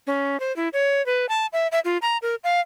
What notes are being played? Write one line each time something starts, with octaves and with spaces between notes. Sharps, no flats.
C#4
C5
E4
C#5
B4
A5
E5
E5
F4
A#5
A#4
F5